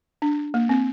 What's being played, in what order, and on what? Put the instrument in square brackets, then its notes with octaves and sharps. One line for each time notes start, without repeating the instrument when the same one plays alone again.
[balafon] D4
A#3
C4